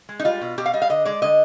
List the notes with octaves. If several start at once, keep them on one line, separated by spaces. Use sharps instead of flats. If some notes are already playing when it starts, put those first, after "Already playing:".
G#3
D#4
G3 F4
B2
B2 G4
F5
G3 D#5
F5
D3 D#5
G#3 D5
D3 D#5